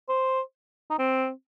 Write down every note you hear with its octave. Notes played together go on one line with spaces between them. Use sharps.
C5
D#4
C4